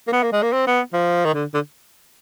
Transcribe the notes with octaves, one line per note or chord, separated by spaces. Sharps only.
A#3
B3
A#3
G#3
A#3
C4
B3
F3
D#3
D3
D3